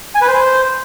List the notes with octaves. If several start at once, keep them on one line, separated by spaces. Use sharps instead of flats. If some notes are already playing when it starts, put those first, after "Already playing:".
G#5
B4
C5